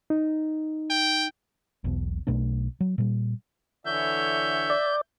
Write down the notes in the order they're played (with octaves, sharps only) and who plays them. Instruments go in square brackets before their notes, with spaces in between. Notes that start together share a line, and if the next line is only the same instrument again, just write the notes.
[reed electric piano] D#4
[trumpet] G5
[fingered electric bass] E1 B1 B2
B1 B2 A3 D4
F#3
A#2 G3
[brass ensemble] D3 E3 C#5 [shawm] E5 [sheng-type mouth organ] G6
[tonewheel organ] D5